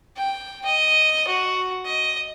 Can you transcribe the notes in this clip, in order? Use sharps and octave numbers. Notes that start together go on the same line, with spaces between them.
G5
D#5
F#4
D#5